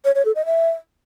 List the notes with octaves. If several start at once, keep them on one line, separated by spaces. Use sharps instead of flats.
C#5
C#5
A4
D#5
E5